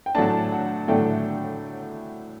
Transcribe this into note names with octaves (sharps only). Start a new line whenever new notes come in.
G5
A2 F#3 A3 D4 A5
F#5
A2 F#3 A3 D4 G5